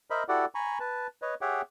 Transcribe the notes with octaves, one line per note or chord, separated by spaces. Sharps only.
A#4 C5 D#5 E5 B5
E4 F#4 G4 A4 D5 F#5
G#5 A#5 B5 C#6
B4 A5
B4 C#5 D#5
G4 G#4 C#5 E5 F#5 G5